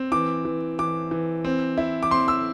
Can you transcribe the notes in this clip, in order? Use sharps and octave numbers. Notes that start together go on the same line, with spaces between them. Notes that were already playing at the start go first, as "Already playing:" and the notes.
Already playing: C4
E3 D6
E3
E3 D6
E3
C4
E4
D6
C4 C6
E6